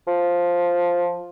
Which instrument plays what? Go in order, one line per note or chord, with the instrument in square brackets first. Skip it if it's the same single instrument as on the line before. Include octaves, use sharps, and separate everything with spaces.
[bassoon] F3